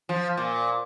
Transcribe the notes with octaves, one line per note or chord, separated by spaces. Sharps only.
F3
A#2